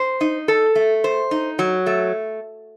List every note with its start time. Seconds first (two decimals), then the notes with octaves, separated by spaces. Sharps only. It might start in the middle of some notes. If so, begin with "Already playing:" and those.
Already playing: C5
0.21 D#4
0.48 A4
0.76 A3
1.04 C5
1.31 D#4
1.59 F#3
1.86 A3